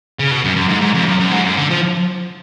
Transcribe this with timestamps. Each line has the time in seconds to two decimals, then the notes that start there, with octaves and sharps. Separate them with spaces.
0.19 C#3
0.31 B2
0.44 F#2
0.56 F#2
0.69 G#2
0.81 G#2
0.95 F2
1.06 F#2
1.20 F#2
1.32 G#2
1.45 F#2
1.58 D3
1.70 F3